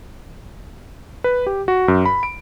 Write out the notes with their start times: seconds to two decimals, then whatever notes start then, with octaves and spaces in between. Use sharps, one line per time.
1.24 B4
1.47 G4
1.68 F#4
1.88 F#2
2.06 B5
2.23 D7